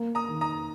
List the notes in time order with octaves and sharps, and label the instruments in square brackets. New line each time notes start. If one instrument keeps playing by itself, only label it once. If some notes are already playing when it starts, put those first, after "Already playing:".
Already playing: [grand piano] A#3
[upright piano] A#5 D#6
[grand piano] D#3
[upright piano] A#5 D#6